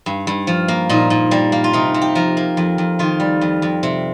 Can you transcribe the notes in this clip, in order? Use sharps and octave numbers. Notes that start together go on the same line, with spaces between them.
G2
G2
F3
A#3
A#2 D#4
A#2
G3 A#3
A#3
F4
C3 D#4
C3
G4
F3 A#4
A#3
F2
F2
D#3 F4
G3
F2
F2
C3